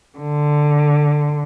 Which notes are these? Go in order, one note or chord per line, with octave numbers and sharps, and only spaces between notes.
D3